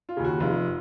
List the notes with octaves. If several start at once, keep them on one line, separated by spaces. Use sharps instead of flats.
F4
D#2 C#3
F#4
F1 F4